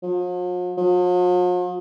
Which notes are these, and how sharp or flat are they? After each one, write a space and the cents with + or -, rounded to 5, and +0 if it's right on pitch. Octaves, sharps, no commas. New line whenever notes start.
F3 +45
F3 +45